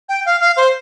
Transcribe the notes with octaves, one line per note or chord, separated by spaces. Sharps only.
G5
F5
F5
C5